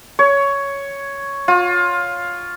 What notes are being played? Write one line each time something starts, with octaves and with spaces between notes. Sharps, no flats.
C#5
F4